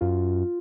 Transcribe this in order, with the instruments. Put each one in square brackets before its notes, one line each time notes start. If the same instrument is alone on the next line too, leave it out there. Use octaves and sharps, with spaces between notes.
[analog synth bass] F#2 [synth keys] F4